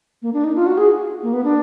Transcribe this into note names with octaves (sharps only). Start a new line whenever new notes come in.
A#3
D4
D#4
F4
F#4
G#4
A#3
B3
D4